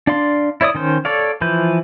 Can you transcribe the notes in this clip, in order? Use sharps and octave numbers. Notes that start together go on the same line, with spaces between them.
D4 D5 F5 C6
E4 C#5 D5 D#6
D#3 C#4 C5
A4 C#5 D5 F5
E3 F3 B4 G6